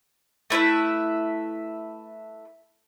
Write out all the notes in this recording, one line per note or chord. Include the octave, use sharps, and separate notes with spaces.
A3 E4 B4 E5